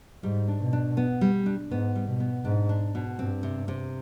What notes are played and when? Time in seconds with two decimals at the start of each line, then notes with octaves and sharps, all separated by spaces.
0.23 G#2 G3
0.48 D4
0.60 B2
0.73 D4
0.97 B3
1.21 G3
1.46 D4
1.71 G#2 B3
1.96 G3
2.08 B2
2.20 B3
2.45 G#2 D4
2.69 D4
2.95 B2
3.19 G2 C4
3.43 C3
3.68 C3